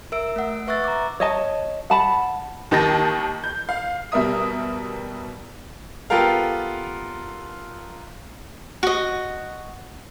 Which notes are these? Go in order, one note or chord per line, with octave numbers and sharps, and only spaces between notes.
A#4 E5 E6 D7
A3 F#5
B4 E5 C#6 E6 F#6 A6
A#5 D6
C#5 D#5 A5
F#5 A5 B5
D#2 D#3 G4 A5 A#6
G6
F5
B2 G3 A#4 E5 D#6
B3 F4 G4 A4 A#4 F5
F#4 D#5